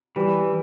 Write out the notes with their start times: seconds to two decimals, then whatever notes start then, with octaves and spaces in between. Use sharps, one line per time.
0.16 E3 G3